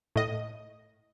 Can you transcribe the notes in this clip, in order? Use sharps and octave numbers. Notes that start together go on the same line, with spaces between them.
A2 D#5